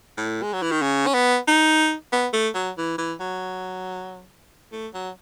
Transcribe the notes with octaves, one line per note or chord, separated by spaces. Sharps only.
A2
G#3
F#3
E3
D#3
C#3
C#4
B3
D#4
B3
A3
F#3
E3
E3
F#3
A3
F#3